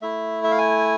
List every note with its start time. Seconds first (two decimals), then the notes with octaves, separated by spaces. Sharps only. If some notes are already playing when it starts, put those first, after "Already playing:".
0.02 A3 E4 E5
0.44 E5
0.51 F5
0.58 G#5